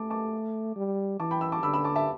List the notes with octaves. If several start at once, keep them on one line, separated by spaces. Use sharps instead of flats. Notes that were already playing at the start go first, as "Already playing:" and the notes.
Already playing: A3 A5 D6
A5 D6
G3
E3 A5 D6
G5 B5
B5 E6
A5 D6
D3 B5 E6
B5 E6
A5 D6
E5 A5